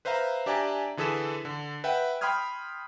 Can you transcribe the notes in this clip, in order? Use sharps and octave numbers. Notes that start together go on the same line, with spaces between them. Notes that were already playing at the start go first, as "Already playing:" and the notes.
B4 C5 E5 F5 A#5
D4 G4 D5 E5 G#5 A#5
D3 E3 G#4 A4 B6 E7
D3
B4 E5 F#5 G5
G5 B5 C6 D#6 F6 G#6